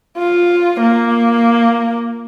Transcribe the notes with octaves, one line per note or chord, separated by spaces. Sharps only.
F4
A#3